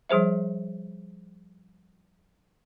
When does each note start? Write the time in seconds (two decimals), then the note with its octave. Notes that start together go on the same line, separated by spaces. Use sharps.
0.09 F3 G3 G#4 C5 E5